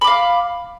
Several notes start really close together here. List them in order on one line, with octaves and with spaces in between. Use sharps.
B5 D6 F5